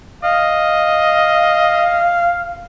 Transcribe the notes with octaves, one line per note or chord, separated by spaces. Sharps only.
D#5 F5